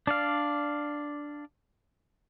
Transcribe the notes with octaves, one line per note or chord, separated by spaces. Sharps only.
D4 D5 F5